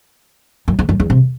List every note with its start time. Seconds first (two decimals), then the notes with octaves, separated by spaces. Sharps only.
0.68 F#2
0.79 E2
0.89 F#2
1.00 E2
1.10 C3